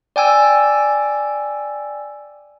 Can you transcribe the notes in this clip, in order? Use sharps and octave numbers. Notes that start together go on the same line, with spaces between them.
D5 G5 G#5 E6